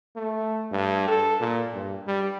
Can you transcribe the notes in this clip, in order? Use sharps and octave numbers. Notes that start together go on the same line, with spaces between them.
A3
G2
A4
A#2
G2
G3